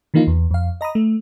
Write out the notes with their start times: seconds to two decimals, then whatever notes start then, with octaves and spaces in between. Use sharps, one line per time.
0.14 D#3 E3 A#3 D#4 F4
0.27 E2
0.51 F2 F5
0.81 D#5 A#5 B5 D#6
0.95 A3